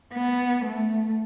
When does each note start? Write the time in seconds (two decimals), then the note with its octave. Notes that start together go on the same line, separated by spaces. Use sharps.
0.14 B3
0.65 A3